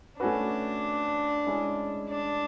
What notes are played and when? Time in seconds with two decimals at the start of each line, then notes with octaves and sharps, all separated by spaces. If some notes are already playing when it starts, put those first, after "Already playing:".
0.20 A3 C#4 D4 F#4 B4
1.46 G#3 C#4 E4 G#4
2.09 D4